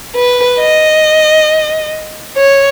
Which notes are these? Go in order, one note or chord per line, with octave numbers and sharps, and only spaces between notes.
B4
D#5
C#5